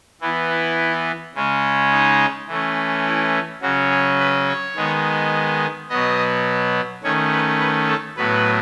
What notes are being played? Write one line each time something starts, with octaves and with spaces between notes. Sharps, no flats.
E3 B3 E4
E4
C#3 G#3 C#4
D#4
E3 A3 C#4
E4
C#3 F#3 C#4 F#4
G#4
B4
C#5
D#3 G#3 B3
B2 F#3 B3 D#5
D#3 A3 C#4 C#5
B4
B4
A4
A2 F#3 B3 B4